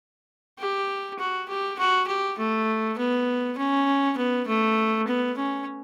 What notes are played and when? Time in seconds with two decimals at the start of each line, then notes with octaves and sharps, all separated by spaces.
0.59 G4
1.19 F#4
1.48 G4
1.78 F#4
2.07 G4
2.38 A3
2.98 B3
3.57 C#4
4.17 B3
4.47 A3
5.07 B3
5.37 C#4